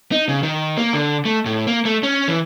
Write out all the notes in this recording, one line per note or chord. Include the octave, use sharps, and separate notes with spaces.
D#4
C#3
D#3
A#3
D3
A3
A2
A#3
A3
C#4
E3